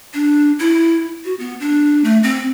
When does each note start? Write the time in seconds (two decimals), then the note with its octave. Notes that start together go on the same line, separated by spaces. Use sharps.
0.14 D4
0.59 E4
1.24 F#4
1.39 B3
1.60 D4
2.04 A3
2.23 C4